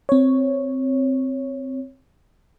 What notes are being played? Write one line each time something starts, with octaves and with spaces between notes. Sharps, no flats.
C4 C#5